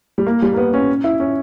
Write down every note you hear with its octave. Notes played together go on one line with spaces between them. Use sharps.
G3
A#3
G3
A#3
B3
C#4
E4
C#4